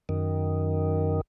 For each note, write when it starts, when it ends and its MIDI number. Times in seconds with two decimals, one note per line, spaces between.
0.09 1.21 42
0.09 1.21 51